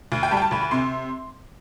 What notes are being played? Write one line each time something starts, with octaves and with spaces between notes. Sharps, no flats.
D2
G5
G3 A5
G5
A5
D2 B5
B5
C3 C6